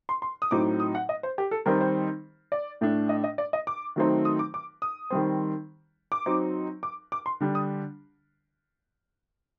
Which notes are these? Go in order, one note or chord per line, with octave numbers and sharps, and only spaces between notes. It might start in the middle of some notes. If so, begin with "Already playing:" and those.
C6
C6
D#6
A2 F#3 C4 D#4 D6
D#6
F#5
D#5
C5
G4
A4
D#3 G3 C4 D#4 A#4
C5
D5
A2 A3 D4
D#5
D#5
D5
D#5
D6
D#3 F#3 A3 C4 D#4
D#6
D6
D6
D#6
D#3 G3 C4
D6
F#3 C4 D#4
D6
D6
C6
D3 G3 D4
D#6